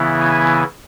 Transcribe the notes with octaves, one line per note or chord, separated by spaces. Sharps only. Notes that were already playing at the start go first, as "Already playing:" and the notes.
Already playing: C#3 E3 B3 E4
G#5